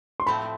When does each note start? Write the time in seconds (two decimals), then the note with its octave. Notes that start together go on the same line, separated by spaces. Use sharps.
0.20 C6
0.27 A2 F3 A3 C4 B5